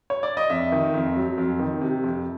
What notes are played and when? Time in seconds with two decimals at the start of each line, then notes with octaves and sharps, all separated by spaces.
0.10 C#5
0.23 D5
0.37 D#5
0.50 F2 E5
0.72 D#3
0.94 F2
1.16 F#3
1.38 F2
1.59 D#3
1.82 C3
2.04 F2